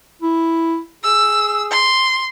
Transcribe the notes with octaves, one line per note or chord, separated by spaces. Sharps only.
E4
G#4 E6
C6